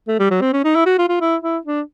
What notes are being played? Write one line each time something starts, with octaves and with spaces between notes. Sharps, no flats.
A3
G3
F#3
C4
C#4
D#4
E4
F#4
F4
F4
E4
E4
D4